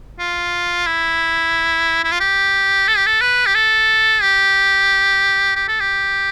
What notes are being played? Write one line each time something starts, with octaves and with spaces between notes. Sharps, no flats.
F4
E4
E4
F4
G4
A4
G4
A4
B4
G4
A4
G4
G4
A4
G4